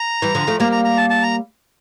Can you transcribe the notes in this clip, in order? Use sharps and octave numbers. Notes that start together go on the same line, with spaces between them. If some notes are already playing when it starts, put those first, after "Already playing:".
Already playing: A#5
E3 G3
D3 F3
F3 A3
G3 A#3 A#5
A#5
A#5
A5
A5
A#5